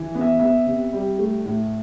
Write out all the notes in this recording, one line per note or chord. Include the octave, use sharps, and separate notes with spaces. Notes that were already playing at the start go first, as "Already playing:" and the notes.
Already playing: E3
B3
E5
B3 E5
C3
G3
A3
A2